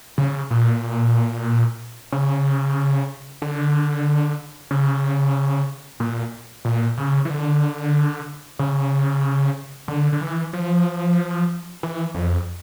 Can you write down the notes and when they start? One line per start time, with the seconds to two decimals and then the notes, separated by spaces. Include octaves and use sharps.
0.18 C#3
0.51 A#2
2.12 C#3
3.42 D3
4.71 C#3
6.00 A#2
6.65 A#2
6.97 C#3
7.25 E3
7.30 D3
8.59 C#3
9.88 D3
10.12 D3
10.21 E3
10.53 F3
11.83 E3
12.14 F2